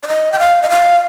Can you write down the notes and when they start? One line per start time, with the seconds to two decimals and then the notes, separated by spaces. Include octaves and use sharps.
0.03 D5
0.08 D#5
0.32 G5
0.39 F5
0.62 D#5
0.70 F5